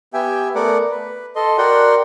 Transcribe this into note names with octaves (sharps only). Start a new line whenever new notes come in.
B3 G4 E5 G5 G#5
A3 B3 A#4 D5 F#5 D6
B4
A4 D#5 C6
F#4 A#4 D5 F#5 G5 C6